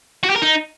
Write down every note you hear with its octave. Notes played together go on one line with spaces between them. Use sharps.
F#4
G4
A#4
D#4